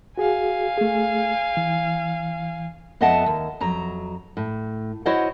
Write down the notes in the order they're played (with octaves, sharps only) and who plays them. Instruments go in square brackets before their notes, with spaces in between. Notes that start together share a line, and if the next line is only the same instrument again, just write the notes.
[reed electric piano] F#4 G#4 [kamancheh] F5 G#5
[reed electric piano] A3 G#4
E3
[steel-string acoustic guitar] F2 B3 D#5 E5 F#5 A5
D#2
F2 F#3 A#5
A2
E4 F#4 C5 C#5 D#5 F#5